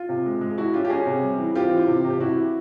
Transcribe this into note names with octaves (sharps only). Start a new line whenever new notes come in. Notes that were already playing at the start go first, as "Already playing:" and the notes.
Already playing: F4
C3
G#3
G#3
G#3 E4 F#4
C#4 F4 G4
G4
C#4 F#4 G#4
C3
G3
E3
C4 F4 G4
E3
C3
C3
G4
C3 E4 F#4
E3